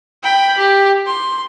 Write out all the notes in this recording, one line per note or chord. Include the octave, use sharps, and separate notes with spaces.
G5 B5
G4
C6